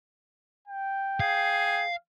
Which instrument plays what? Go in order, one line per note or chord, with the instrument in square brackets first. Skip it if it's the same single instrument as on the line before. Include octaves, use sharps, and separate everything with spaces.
[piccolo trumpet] G5
[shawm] G#4 [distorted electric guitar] F5